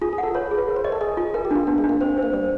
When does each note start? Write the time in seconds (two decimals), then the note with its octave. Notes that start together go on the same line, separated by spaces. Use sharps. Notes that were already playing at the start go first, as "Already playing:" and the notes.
0.02 F4 G#4
0.13 G#4
0.18 F#5
0.23 A4
0.35 B4 C#5
0.51 G#4
0.68 A#4
0.76 C5
0.84 C#5 D#5
0.92 A4
1.01 G#4 D#5
1.17 F4
1.34 G#4 A#4
1.45 G4
1.51 D4
1.56 F4
1.67 B3 D4
1.78 G#3
1.84 D4
1.89 A#3
2.01 C4 C5
2.18 A#3 C5
2.33 G3 C5